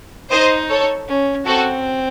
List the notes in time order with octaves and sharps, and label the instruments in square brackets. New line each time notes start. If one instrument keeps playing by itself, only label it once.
[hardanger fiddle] D#4 [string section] C5 D#5
[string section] A4 C#5
[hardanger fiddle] C#4
[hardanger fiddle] C4 [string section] F#4 A4